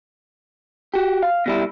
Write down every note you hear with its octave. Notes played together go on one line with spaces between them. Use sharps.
F#4 G4
F5
B2 G3 E4